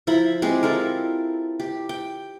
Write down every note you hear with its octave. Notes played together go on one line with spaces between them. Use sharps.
F3 E4 A#5 B5
G#3 C4 G4
E4 F4 A4 A#4
G4
G5